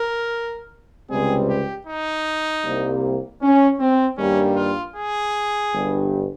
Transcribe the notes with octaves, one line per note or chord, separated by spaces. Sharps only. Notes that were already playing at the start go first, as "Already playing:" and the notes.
Already playing: A#4
C#2 C3 G3 C4 G#4
G4
D#4
C2 C3 G3 A#3
C#4
C4
G2 D#3 G3 A#3 C#4
F4
G#4
G1 G2 G3